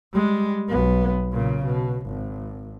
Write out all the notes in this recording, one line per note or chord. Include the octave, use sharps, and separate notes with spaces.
G3 G#3
B1 B3
A#2 C#3
B2
G#1